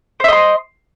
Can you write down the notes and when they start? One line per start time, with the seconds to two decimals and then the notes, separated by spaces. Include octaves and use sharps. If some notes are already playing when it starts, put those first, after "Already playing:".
0.20 C5
0.24 E5
0.28 D#5
0.32 C6